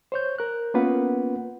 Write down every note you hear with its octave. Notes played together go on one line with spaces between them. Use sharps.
C5 C#5 G6
A#4 F#6
A#3 B3 C#4 F4 B4 F#5